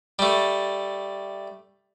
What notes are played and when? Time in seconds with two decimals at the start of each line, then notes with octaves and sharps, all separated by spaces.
0.19 G3 A3